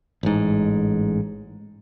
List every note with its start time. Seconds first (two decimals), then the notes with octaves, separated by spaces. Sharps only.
0.23 A1 G#2